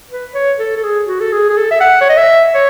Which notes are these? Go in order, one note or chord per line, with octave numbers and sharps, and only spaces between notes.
B4
C#5
A4
A4
G#4
F#4
A4
G#4
G#4
A4
E5
F#5
C#5
D#5
E5
C#5